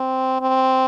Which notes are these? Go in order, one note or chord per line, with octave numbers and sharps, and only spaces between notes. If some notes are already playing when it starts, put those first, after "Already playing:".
Already playing: C4
C4